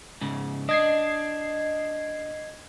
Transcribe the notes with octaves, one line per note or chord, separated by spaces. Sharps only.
G#2 C#3
D4 D#5 G#6 C7